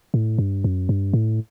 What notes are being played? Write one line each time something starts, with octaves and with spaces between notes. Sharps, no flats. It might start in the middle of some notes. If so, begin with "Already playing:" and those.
A2
G2
F#2
G2
A2